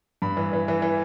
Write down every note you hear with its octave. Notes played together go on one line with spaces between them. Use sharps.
G2 B5
E3
E3
E3
E3